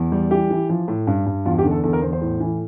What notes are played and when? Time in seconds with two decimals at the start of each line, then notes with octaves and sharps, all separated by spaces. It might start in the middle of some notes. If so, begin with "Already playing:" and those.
Already playing: E2
0.12 G3
0.31 E3 G4
0.51 E3
0.69 F3
0.88 A2
1.07 G2
1.26 G2
1.45 E2 F4
1.58 G4
1.65 D3
1.71 A4
1.84 E2 A4
1.93 A#4
2.02 E2 C5
2.13 C5
2.21 A2
2.40 E3